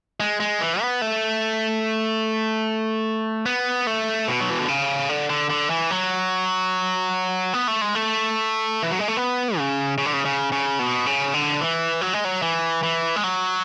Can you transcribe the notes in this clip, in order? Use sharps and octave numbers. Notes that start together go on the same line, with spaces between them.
G#3
G#3
E3
B3
A3
B3
A3
B2
F#3
E3
D3
C#3
D3
D3
D3
E3
F#3
B3
A3
G#3
A3
E3
F#3
G#3
A3
B3
C#3
C#3
D3
C#3
C#3
C#3
B2
C#3
D3
E3
F#3
G#3
F#3
E3
E3
G#3
F#3